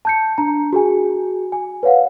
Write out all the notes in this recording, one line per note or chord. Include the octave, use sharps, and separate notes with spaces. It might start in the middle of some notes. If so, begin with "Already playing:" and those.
A5 G6 C#7
D4 A#5
F#4 G#4 G#5
G#5
B4 C#5 F5 F#5